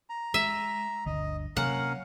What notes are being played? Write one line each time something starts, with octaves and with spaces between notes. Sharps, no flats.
A#5
G#3 E5
G1 D2 D3 D#5
C3 F#3 A#3 C#4 A#4 F5 F#5